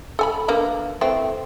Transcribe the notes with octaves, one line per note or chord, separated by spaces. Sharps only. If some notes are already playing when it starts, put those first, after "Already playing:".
A4 G#5 B5
D3 A#3 B3
E3 A3 C4